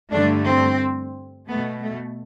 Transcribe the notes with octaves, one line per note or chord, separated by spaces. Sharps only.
G2 D3 A3 D4
C4
B2 A3 B3
A3